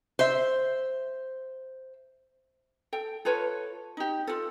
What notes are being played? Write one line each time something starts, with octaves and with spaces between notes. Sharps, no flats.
C5 E5
A4 G5
F4 A4 B4 C#5
D#4 G4
F4 A4